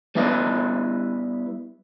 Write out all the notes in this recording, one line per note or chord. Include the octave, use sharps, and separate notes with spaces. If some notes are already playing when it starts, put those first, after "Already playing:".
G3 B3 E4 B4 D#5